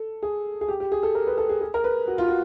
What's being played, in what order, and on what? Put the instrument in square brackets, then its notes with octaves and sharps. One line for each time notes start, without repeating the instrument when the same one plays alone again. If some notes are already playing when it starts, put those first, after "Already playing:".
Already playing: [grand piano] A4
G#4
G#4
G4
G4
G#4
A4
A#4
B4
A4
G#4
G#4
A#4
B4
F#4
F4
F#4